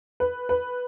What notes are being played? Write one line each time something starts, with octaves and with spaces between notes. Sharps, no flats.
B4
B4